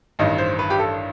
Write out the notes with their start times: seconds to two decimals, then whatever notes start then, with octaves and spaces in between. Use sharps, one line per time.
0.19 A1 G2 D#3 D#5
0.38 C5
0.59 B4
0.70 G4
0.79 A4